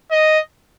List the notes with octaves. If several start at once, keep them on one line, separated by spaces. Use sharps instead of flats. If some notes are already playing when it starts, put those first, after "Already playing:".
D#5